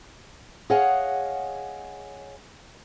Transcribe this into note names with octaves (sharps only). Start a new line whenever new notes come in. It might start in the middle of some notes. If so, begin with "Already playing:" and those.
G#4 C#5 D#5 F5 F#5 G#5